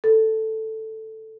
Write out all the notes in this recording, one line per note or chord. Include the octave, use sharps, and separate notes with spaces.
A4